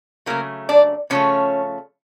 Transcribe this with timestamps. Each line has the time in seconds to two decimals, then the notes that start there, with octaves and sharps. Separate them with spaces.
0.26 C#3 F#3 A3 A#3 A#4
0.69 D4 D5
1.10 C#3 F3 A3 C#4 C#5